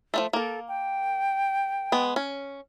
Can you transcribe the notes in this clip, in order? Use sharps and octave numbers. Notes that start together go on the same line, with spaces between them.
F3 G#3 A3
A#3 A4 A#4
G5
G#3 B3
C#4